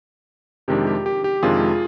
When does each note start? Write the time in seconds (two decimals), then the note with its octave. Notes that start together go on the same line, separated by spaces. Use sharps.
0.68 F2 C3 D#3 G#3 D4 G4
0.87 G4
1.06 G4
1.24 G4
1.43 F2 C3 D#3 G#3 D4 F4 G#4